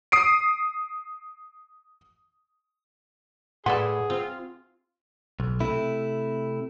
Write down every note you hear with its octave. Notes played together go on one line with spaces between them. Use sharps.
D#6 C7 D7
A2 G#4 B4 D5 E5 F#5 C6
C4 F4
B1
C3 A3 E4